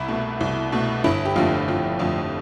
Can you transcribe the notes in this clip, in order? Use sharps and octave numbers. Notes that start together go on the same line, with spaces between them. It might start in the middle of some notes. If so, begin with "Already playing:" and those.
Already playing: C2 E4
B2 A3
C2
B2 A3
G1 E4
G4
F2 D3 A3 F4
G1 F4
F2 D3 A3 F4